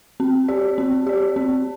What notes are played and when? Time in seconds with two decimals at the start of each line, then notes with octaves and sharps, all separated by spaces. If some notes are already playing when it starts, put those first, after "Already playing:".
0.20 C4
0.48 G4 D5
0.78 C4
1.07 G4 D5
1.36 C4